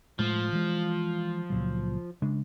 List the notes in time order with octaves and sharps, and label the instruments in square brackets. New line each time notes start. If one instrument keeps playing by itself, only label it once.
[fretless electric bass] A2 G#3 A3 [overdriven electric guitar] F3
[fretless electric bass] E3 G#3
C#2 A#2 F#3
C#3 G#3 D4